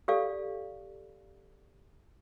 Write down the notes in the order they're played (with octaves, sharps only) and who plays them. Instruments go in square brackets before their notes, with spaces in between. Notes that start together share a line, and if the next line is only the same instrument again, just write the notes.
[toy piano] G4 A4 D5 F5